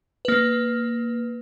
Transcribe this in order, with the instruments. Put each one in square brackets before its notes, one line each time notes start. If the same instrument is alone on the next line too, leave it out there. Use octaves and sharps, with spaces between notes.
[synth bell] A#3 B4